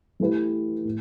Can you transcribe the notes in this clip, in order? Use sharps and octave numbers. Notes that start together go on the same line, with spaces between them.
E3 A3 E4 G4 B4
A2